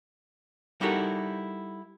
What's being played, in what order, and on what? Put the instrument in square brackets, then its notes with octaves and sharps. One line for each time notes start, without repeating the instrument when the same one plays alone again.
[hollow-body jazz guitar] G3 D#4 E4 F#4 A4 A#4